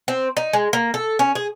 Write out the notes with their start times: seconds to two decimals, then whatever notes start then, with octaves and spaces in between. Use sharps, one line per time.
0.08 C4
0.37 D#4
0.53 G#3
0.73 A#3
0.94 A4
1.19 C#4
1.35 G#4